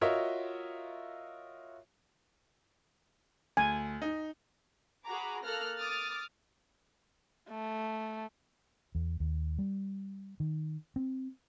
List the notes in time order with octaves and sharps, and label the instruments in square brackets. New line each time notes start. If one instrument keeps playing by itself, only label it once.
[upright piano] F4 F#4 A#4 C#5 D#5 E5
[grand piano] D2 [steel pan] G#5
[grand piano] D#4
[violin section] F#4 G#4 A#5 B5 D6
A#3 A4 F6 F#6 A#6
D6 D#6 F6 A6
[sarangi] A3
[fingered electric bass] E2
D#2
G3
D#3
C4